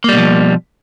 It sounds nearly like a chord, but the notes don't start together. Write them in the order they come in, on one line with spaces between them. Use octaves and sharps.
A#3 G3 B2 F3